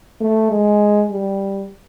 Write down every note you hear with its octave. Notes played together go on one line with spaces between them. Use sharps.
A3
G#3
G3